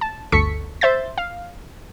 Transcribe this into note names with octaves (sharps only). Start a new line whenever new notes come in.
A5
G1 D2 A4 C#6 B6 C#7
C5 E5 G6 A6
F5